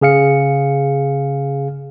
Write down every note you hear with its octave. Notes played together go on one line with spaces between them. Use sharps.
C#3 G#4 F5 C#7